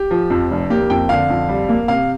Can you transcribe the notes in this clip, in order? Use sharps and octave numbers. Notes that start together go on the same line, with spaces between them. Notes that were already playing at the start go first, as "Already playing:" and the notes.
Already playing: G4
F3
F2
F1
A#3 G4
F2 G5
D3 F5
F2
G3
A#3
C3 F5